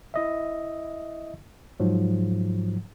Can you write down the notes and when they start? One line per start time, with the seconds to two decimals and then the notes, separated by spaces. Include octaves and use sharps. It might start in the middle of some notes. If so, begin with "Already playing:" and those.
0.14 E4 D#5 E5
1.80 G#2 F3 F#3